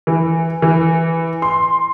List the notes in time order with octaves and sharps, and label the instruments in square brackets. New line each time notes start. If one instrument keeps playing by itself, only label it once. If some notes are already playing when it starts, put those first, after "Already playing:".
[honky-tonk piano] E3
E3
C6